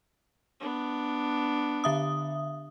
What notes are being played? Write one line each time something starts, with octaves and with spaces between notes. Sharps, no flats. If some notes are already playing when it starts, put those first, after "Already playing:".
B3 D4
D3 E5 D#6